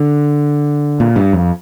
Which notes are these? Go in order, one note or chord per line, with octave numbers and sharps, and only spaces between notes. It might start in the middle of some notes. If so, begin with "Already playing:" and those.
Already playing: D3
A#2
G2
F2